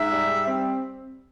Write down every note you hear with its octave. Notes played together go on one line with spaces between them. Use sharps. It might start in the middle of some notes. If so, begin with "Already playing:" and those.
Already playing: G#2 E5
G3
C4